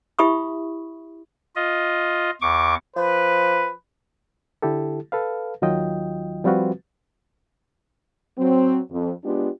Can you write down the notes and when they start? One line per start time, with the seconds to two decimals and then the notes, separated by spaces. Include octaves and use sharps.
0.19 E4 G4 E5 B5 C#6 D#6
1.56 F4 D#5
2.41 E2 C#6 D6
2.96 F3 B4
4.62 D3 E4 G4 A4
5.12 A4 B4 F5
5.62 D#2 D#3 F#3 F4 D#5 G5
6.44 F3 G3 C4 F4 F#4 B4
8.38 F#3 C4
8.91 F2
9.24 G#3 B3 D4 F4 G4